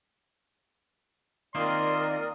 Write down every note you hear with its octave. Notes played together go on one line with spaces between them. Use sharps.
D#3 A#3 C4 F4 A#4 D5 C6 D#6